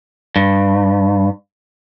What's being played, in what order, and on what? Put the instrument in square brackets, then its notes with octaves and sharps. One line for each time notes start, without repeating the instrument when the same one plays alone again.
[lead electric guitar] G2